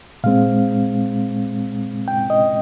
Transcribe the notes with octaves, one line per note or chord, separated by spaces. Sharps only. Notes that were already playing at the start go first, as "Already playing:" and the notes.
A#2 G#3 C4 F5
G5
D#5